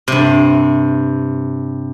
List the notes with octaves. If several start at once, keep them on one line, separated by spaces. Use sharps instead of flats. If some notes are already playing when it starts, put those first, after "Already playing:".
G2 C3